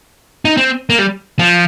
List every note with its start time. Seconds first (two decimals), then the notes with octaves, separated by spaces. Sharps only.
0.45 D#4
0.57 C4
0.90 A#3
0.99 G3
1.39 F3